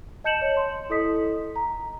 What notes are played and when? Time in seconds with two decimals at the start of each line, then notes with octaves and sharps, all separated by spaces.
0.24 D#5 A5 G6 C#7 E7 F#7
0.42 C#5
0.57 C6
0.90 E4 A4 D#5 D#6 B6
1.56 A#5